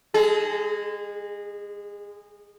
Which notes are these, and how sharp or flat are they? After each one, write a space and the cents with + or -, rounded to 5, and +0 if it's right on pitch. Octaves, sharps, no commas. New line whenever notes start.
G#3 -25 G#4 +30